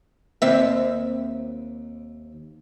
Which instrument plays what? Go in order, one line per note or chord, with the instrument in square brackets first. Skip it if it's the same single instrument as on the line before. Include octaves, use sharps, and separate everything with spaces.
[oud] D#2 C4 E5